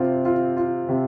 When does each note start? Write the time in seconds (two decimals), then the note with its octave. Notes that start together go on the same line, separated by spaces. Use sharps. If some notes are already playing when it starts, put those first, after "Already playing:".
Already playing: C3 C4 F4
0.25 F4
0.57 F4
0.89 C3